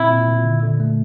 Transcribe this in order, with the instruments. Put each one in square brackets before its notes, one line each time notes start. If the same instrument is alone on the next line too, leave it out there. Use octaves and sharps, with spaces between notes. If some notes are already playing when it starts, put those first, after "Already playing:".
Already playing: [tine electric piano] A#2 C4 [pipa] E4
[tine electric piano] A#2
A#2
D3
D3
A3